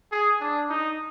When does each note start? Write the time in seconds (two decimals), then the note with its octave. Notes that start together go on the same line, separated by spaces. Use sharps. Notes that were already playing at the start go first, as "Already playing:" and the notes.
0.12 G#4
0.41 D4
0.69 D#4